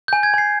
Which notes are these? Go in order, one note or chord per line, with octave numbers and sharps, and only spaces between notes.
G#5 G6
G#6
G#5 C7